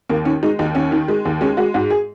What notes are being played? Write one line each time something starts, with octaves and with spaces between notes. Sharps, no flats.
D#2 A#3
D#3 C#4
G#3 D#4
D#2 D#4
D#2 C#4
D#3
G#3
D#2
G#3 C#4
G#3 F#4
G#2 F#4
G#4